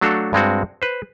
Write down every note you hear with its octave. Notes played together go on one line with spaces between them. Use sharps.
F#3 A3 D4 F#4 A4 F5
G2 G#3 C4 F#4
B4 C5